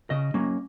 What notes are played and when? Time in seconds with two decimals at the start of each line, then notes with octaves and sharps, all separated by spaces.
0.10 C#3 D#5
0.34 F#3 A#3 C#4